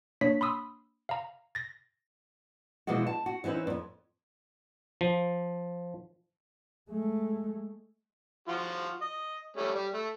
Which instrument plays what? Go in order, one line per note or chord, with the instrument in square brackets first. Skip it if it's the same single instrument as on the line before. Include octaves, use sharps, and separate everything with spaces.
[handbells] A#3 D4 C#5 B6
B5 C6 D#6 E6
F5 A#5
A6 A#6
[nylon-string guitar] B2 E3 F3 G#3 F#4
A5
F#4
E3 C4 C#4 D#4 B4
F2 G#2
[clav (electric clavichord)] F3
[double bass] G#3 A3
[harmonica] F3 F4 F#4
D#5
G3 A3 C#4
G3
A3